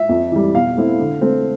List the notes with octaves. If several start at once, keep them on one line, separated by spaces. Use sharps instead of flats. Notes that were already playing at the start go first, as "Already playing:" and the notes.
Already playing: E5
F2
E3 G3
B2 F5
A3 C4 E4
D3
A3 C4